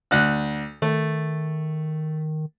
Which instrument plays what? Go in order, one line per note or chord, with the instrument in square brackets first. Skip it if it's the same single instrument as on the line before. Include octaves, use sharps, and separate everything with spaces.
[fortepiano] D2 F#6
[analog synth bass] D#3 [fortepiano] A3